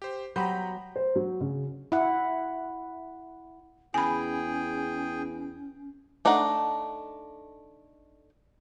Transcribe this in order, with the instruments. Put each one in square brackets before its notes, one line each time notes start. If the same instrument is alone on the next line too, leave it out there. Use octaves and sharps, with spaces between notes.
[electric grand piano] G4 C5
[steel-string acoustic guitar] F#3 [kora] B3 G4 C5 [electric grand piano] A#5 B5 G6
[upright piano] C5
F#3
C#3
[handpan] E4 F#5
[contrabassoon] E2 [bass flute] C#4 [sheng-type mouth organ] G#4 G5 [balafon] G#5 B5
[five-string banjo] A3 D4 D#4 A4 F#5